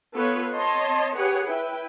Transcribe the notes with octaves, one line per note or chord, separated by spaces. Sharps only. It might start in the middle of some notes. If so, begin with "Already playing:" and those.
B3 F4 A4 B4 C#5
C4 C#5 D#5 A5 C6
G4 G#4 B4 C#5 F#5
E4 B4 G5